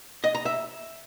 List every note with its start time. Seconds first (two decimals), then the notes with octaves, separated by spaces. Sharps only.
0.24 D#5
0.35 A#5
0.45 E5